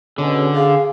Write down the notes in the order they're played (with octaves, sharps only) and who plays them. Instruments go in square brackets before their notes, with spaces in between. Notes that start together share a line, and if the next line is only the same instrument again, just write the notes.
[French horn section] B2 C#4 G#4 [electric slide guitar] D3
[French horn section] G#4 [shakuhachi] F5